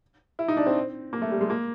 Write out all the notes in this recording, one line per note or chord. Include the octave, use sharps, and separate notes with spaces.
E4
D#4
D4
C4
A#3
A3
G3
G#3
A#3